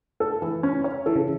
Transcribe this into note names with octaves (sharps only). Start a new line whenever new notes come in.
A4
E3
C#4
C#5
E3 A4
C#3